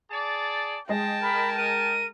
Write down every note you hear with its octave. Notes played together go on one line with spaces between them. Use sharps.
G#4 D5 A5
G#3 G#4 D#5 G5 A5 A#6
A#4 B5
A#4 D#7